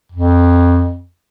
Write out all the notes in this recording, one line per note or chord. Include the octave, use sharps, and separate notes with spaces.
F2